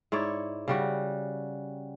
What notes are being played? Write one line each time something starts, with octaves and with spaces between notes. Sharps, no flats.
G#2 E4 C#5 D5
C#3 G3 F#4